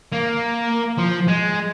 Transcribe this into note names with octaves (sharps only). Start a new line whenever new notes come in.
A#3
F3
G#3